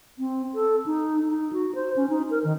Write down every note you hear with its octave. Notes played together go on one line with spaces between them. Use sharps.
C4
A4
D#4
D#4
F#4
C5
C#4
D#4
A#4
D#3